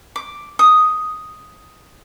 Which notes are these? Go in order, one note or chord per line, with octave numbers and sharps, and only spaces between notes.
D6
D#6